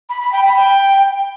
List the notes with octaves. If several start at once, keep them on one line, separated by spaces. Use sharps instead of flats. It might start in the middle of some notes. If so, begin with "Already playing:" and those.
B5
B5
G5
B5
G5